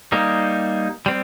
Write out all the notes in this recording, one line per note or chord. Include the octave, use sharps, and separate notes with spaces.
G3 A#3 D#4
G3 C4